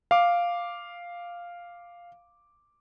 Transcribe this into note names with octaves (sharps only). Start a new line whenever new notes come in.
F5 D6